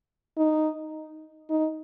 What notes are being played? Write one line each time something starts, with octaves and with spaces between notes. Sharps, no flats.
D#4
D#4